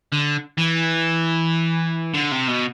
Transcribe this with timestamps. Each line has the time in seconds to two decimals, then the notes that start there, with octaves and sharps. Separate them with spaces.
0.12 D3
0.58 E3
2.14 D3
2.31 C3
2.48 B2